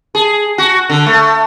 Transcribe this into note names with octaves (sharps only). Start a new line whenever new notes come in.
G#4
F#4
D3
A3